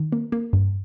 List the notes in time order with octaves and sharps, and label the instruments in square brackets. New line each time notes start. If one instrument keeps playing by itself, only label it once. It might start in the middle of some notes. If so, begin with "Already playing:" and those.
Already playing: [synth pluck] D#3
A#3
A#3
G2